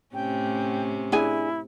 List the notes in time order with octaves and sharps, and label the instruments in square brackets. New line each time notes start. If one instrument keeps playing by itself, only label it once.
[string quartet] A2 C3 C#4 [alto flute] G5
[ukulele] D4 G#4 G#5 [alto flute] E4